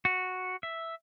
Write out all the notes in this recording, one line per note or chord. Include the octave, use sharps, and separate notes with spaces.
F#4
E5